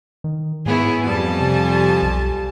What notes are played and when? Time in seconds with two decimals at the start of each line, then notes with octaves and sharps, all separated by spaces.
0.24 D#3
0.66 G#2 B3 E4 G#4 C#5
1.04 F2 G3 B3 G#5 A5
1.41 C3
2.02 B1